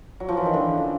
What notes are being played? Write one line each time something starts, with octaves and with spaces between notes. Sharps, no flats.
F#3
F3
E3
D#3
D3
C#3